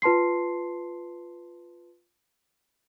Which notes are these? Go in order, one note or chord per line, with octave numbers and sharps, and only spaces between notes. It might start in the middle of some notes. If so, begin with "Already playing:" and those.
F4 B4 A5 C6 C7